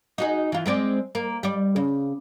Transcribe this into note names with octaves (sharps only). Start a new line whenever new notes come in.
D#4 F#4 G#4
E3 F4
G#3 C4 D5
A#3
G3 D5
C#3